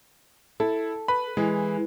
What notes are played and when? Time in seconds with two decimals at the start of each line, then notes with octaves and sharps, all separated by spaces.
0.60 E4 A4
1.08 B4 B5
1.37 E3 G#3